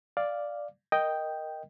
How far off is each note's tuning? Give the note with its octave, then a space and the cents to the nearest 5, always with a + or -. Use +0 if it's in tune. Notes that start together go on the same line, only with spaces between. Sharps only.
D5 +0 F5 +0
A#4 +0 D#5 +0 G5 +0